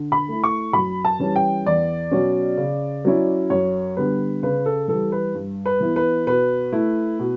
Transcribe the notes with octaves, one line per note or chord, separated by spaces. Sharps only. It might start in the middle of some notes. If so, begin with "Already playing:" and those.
Already playing: D3
B5
A3 E4
C#6
F#2 B5
A5
E3 G3 C#4
G5
E2 D5
B2 F#3 C#4
C#3
F#3 C#4 E4
F#2 C#5
D3 G3 B3 B4
C#3 B4
A4
E3 G3 A4
B4
G2
B4
E3 B3 E4
B4
B2 B4
A3 E4
B2